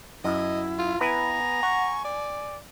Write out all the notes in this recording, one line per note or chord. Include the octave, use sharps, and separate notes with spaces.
F#2 E4 D#5
F4
B3 E4 B4 G#5 A#5
F#5 C#6
D5